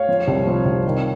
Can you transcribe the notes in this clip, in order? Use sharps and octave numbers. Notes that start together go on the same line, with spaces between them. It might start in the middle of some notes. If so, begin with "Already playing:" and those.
Already playing: C#5 F5
F3
C2
F3
C2
D#3